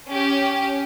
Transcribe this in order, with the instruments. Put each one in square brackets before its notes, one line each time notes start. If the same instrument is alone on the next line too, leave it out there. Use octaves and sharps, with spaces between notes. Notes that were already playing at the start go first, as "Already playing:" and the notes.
[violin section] C#4 G4